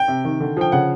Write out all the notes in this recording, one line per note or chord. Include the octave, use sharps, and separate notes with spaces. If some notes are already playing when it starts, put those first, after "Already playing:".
Already playing: G5
C3
D#3
D3
F3 G5
C#3 F#5